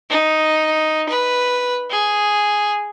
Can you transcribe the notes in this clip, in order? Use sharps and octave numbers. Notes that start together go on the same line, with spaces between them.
D#4
B4
G#4